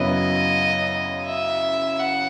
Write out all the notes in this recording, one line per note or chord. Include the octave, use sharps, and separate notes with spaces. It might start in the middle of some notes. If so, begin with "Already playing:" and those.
Already playing: F#2 C#3 F#3 B3 E4 D#5
E5
F#5